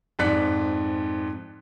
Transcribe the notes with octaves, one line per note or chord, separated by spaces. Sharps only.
F2 G#2 D5 F#6 B6 C#7